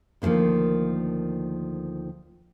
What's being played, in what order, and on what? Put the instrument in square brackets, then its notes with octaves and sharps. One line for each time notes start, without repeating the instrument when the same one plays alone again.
[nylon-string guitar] D2 D3 D#3 F3 A#3